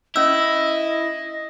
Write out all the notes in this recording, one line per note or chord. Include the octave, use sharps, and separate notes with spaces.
C#4 E4 D#5 E6